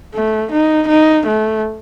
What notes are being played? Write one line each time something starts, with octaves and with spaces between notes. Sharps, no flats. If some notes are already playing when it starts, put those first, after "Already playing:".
A3
D#4
D#4
A3